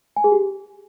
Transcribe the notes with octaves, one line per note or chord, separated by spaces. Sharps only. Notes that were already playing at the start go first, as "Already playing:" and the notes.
G#5
G#4
G4